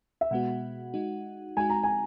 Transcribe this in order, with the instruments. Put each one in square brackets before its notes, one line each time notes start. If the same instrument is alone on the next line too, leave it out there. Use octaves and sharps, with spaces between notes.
[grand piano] E5
[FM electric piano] B2 G#3 B3 F#4 [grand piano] F#5
[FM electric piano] G#3 D#4 F#4
[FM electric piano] G#3 D#4 F#4 [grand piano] G#5
[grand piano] A#5
G#5